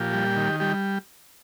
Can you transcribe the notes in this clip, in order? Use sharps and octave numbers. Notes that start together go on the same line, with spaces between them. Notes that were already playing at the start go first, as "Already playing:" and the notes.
Already playing: A#2 F3 G4
G3
D#3
G3 G4